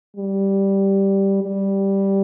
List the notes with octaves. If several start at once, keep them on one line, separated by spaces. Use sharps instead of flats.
G3
G3